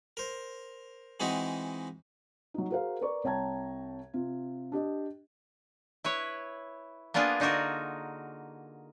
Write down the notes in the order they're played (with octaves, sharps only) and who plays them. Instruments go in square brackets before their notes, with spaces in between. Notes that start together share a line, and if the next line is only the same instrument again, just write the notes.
[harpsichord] A#4 C5
E3 G#3 C4 D#4 E4 F#4
[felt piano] F#3 D#4
F#4 G#4 A#4 C5 F5
A#4 B4 D5 C#6
C2 C#5 G5 A5 A#5 G#6
C3 F4
D4 G4 D#5
[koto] E4 B4 C#5
A#3 B3 D4 F4 G#4
D3 D#4 F4 F#4 A#4